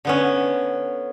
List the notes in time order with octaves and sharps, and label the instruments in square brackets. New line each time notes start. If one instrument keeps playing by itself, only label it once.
[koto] D3 B3 C#4